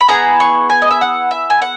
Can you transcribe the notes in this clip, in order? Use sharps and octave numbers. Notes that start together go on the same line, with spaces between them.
B5
B3 E4 G#4 A#5
C#6
G#5
D#5
E5
F#5
E5
G#5
F#5